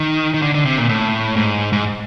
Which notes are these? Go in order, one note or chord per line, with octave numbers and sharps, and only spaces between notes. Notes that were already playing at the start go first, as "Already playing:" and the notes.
Already playing: D#3
D#3
D3
D3
C3
A#2
A2
G#2
G#2